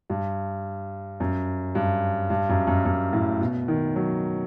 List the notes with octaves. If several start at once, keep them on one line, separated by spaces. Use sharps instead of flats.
G2
F#2
G2
G2
F#2
F#2
F#2
A2
B2
D#3
F#3